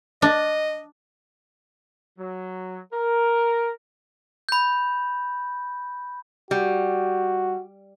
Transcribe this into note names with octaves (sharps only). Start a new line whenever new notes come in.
D4 D#5
F#3
A#4
B5 G6
G3 F#4